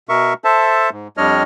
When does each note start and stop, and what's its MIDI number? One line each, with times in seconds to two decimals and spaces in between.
0.09 0.33 47
0.09 0.33 70
0.09 0.33 76
0.09 0.33 85
0.44 0.90 69
0.44 0.90 72
0.44 0.90 76
0.44 0.90 81
0.92 1.08 44
1.17 1.43 41
1.17 1.43 55
1.17 1.43 62
1.17 1.43 73
1.17 1.43 75
1.17 1.43 89